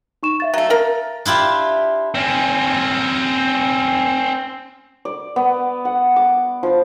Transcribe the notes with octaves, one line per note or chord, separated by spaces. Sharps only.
D#4 C#6 E7
E5 F5 A6
F#3 A3
A#4 A#5
D4 E4 F4 G4
C4 C#4
D5
B3
F#5
D6
F3